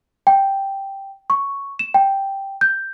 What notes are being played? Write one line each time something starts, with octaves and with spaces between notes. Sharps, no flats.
G5
C#6
E7
G5
G6